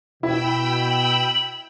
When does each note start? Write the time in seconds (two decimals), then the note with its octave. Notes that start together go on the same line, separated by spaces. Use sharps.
0.23 B2 E4 G5 B5 E6
0.90 F#7